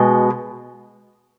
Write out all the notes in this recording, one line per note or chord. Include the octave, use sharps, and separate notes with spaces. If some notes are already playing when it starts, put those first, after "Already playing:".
Already playing: B2 G#3